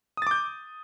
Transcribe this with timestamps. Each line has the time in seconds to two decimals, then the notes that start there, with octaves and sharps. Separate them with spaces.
0.17 D#6
0.22 A6
0.27 D6
0.31 G6